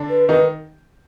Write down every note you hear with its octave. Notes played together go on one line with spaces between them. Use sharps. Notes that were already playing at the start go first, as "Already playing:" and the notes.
Already playing: D3 D4
B4
D#3 D#4 B4